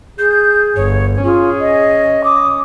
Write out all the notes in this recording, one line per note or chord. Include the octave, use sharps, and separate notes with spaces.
G#4 G6
G1 C#5
C#4 F4 G#4
D#5
D6 D#6